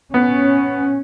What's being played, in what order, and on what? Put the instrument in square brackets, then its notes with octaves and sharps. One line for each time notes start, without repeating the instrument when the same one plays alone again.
[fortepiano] B3 [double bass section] C#4